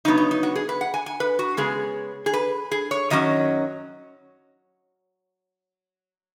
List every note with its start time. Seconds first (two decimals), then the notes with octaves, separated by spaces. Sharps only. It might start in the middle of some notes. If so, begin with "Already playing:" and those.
0.05 C#3 F#3 B3 D#4
0.18 D#4
0.31 D#4
0.43 F#4
0.55 G#4
0.69 B4
0.81 F#5
0.94 G#5
1.06 G#5
1.20 B4
1.39 F#4
1.57 C#3 G#3 B3 G#4
2.26 G#4
2.34 B4
2.72 G#4
2.91 C#5
3.10 F#2 D#3 F#3 C#4 D#5